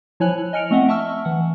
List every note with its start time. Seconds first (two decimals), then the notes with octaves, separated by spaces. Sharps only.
0.20 F3 E4 C#5 G#5 F#6 F#7
0.53 D#5 G#5 F6 C#7 D7 F7
0.71 A3 C4 D#5 E5 F#5
0.88 E5 A5 C#6 E6 F6
1.25 E3 F#5